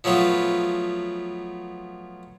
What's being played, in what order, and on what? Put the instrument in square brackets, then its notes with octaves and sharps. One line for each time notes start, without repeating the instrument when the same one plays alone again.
[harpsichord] F3 F#3 A3 B3 F4